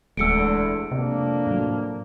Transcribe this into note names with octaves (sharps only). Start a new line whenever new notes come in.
D1 E2 D3 G#3 A3 E6 C#7 D7
F2 C3 A#3 D4
A2 F#3